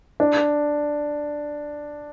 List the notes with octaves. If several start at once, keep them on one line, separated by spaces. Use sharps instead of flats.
D4